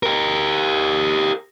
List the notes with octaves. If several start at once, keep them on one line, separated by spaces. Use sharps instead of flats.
G4 A#4